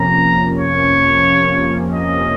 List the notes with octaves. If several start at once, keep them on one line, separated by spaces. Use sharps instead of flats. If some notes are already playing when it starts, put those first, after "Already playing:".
Already playing: F2 C3 F3 A#3 C#4 A#5
C#5
D#5